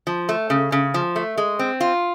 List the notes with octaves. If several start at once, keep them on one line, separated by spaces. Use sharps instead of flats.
F3
A3
C#3
C#3
F3
A3
G#3
C4
F4